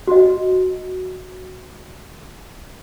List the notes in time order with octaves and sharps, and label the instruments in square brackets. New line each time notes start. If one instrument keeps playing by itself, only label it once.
[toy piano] F#4 D#5